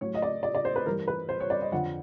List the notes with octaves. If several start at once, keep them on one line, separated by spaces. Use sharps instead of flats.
A2 F#3 C#5
D#5
D5
D5
D5
C5
B4
G2 E3 A#4
B4
C5
C#5
D5
D#5
F2 D3 F3 F#5